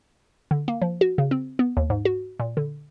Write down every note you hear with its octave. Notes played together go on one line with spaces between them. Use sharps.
D3
A#3
F3
F#4
C#3
C4
B3
D#2
G#2
F#4
A#2
D3